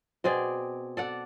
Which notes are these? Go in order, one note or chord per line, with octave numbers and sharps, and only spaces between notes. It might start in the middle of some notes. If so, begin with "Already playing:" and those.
B2 C4 G#4 D5
A4 D5 F#5